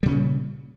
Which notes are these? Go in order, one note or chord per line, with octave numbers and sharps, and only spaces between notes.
A#2 C#3 G3 C#4